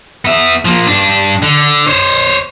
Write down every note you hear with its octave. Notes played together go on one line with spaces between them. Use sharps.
B3 E5
F3 A#3
G2 D4
D3
C5 C#5